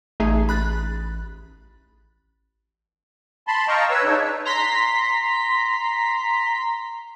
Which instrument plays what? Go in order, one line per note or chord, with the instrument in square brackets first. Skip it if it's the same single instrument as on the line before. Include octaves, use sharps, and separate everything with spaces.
[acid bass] A1 [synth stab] A3 D#4 G#4
[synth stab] B5 F#6 A6
[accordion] A5 B5 C6
D#5 F5 G5 A5 A#5 C#6
B4 C#5 E6
C#3 D4 D#4 C#5
[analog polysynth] A#5 C6 B6